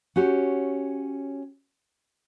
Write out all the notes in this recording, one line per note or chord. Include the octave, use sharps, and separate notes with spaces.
C#4 F#4 G4 C#5